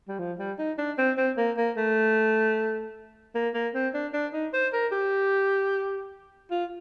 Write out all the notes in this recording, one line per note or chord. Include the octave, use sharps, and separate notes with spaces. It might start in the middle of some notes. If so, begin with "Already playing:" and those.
G3
F3
G3
D#4
D4
C4
C4
A#3
A#3
A3
A#3
A#3
C4
D4
D4
D#4
C5
A#4
G4
F4